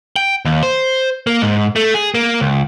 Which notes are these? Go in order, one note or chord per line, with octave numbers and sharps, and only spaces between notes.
G5
D#2
C5
A#3
G#2
A3
G#4
A#3
C#2